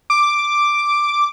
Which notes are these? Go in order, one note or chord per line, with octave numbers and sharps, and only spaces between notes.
D6